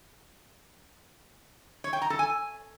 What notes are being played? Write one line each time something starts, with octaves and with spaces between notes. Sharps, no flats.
C#5
G5
A#5
A4
G#5